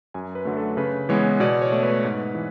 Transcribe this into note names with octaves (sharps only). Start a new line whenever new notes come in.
F#2 G#5
B4
D3 F#3 A3
A4
C#3 B4
E3 G#3 B3 C#5
B2 D5
C#5
A3
B4
G#2
E3